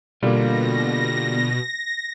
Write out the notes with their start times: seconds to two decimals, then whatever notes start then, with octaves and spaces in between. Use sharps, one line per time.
0.23 B2 D3 G3 A#3 F4 A#6